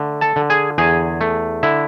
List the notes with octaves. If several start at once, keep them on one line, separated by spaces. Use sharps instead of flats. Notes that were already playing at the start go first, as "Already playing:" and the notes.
Already playing: D3 A3
A4 A5
D3
G#4 G#5
E2 G#4 G#5
A3
D3 E4 E5